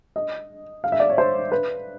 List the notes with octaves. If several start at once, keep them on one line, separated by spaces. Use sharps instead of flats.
D#5
F5
E5
D5
C#5
C5
B4